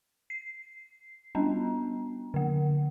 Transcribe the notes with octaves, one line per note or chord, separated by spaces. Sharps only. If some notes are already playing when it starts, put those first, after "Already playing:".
C7
G3 B3 C#4 D4
D3 A#3